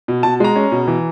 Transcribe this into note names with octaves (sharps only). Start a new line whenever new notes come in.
B2
B2 A5
G#3 A#5
C#4
B2
E3